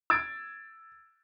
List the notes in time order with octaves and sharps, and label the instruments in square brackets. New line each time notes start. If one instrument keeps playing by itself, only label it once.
[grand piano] E6 G#6 A6 D7